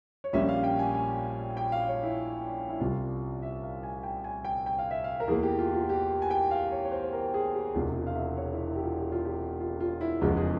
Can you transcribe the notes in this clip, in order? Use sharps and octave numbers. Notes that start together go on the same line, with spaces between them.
C#5
A#1 A#2 G3 C#4 E5
F5
G5
G#5
G#5
G5
F5
C#5
E4
E4
C2 C3 G3 F4
E5
F5
G#5
G5
G#5
G5
G5
F5
E5
F5
A#4
E2 E3 A#3 G#4
G4
F4
F4
G4
G#5
G5
F5
C#5
C#5
C5
C5
A#4
G#4
G4
E1 E2 C3 E3 F4
F4
F5
E5
C#5
E4
E4
G4
F4
G4
F4
G4
F4
F4
E4
F1 E2 C#3 F3 G#3 F4
G#4